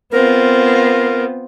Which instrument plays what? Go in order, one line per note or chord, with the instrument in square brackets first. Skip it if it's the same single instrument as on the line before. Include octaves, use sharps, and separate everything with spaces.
[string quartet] B3 C4 F4 [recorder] A#4